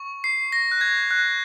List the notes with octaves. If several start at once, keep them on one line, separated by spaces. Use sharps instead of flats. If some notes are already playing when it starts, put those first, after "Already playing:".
Already playing: C#6
C7
A#6
F#6
G#6
F#6